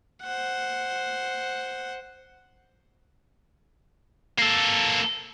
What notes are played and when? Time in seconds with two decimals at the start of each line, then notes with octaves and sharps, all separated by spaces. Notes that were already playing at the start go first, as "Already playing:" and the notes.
0.23 C5 F#5
4.39 A#3 A4